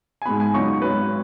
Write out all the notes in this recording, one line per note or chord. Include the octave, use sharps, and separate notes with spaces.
G#5
G#2 G#3 B3 B5
G#5
C#2 C#3 F#3 B3 D#4 C#6
G#1 G#2 F#3 C#4 B4